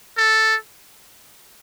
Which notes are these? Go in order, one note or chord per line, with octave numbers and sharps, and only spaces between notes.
A4